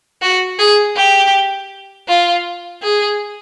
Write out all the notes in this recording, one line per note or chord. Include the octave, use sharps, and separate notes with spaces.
F#4
G#4
G4
F4
G#4